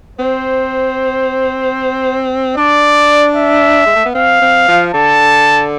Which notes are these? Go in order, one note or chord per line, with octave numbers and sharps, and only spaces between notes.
C4 C5
D4 D5
E5
G#3
A3
B3
C4 F5
C4
F3
D3 A5